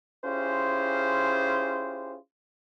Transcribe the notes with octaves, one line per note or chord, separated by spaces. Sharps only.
C#4 E4 F4 G4 G#4 C5